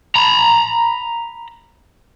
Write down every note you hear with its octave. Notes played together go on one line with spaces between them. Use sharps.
A#5 B5